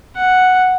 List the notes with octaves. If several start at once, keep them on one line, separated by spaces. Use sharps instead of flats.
F#5